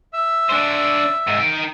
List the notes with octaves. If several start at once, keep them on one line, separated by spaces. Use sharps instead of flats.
E5 E6
D4 C5
G#2 C3
D#4 G5